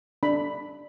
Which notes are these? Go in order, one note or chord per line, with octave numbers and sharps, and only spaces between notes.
D4 B5